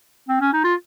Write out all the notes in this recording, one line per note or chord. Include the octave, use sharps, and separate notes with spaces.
C4
C#4
D#4
F4